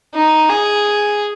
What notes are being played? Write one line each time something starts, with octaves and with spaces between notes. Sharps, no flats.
D#4
G#4